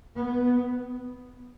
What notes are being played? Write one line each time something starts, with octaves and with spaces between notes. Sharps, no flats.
B3